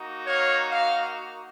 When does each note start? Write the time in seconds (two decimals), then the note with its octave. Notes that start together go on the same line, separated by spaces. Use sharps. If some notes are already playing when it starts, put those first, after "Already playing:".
Already playing: A#3 D#4 F#4
0.26 C#5 F5
0.71 F5